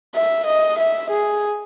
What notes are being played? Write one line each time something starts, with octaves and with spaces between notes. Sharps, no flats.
E5
D#5
E5
G#4